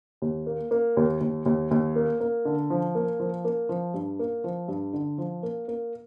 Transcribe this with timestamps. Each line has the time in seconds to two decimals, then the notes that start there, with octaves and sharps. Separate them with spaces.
0.22 D#2
0.46 A#3
0.71 A#3
0.97 D#2
1.21 D#2
1.46 D#2
1.71 D#2
1.96 A#3
2.20 A#3
2.45 D3
2.70 F3
2.95 A#3
3.20 F3
3.45 A#3
3.69 F3
3.94 G2
4.19 A#3
4.44 F3
4.68 G2
4.93 D3
5.18 F3
5.43 A#3
5.68 A#3